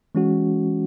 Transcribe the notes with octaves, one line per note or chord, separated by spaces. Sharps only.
E3 G#3 C#4 F#4